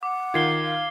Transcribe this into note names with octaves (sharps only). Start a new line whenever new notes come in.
F#5 D6
D#3 F4 G#6 C7 G7
F5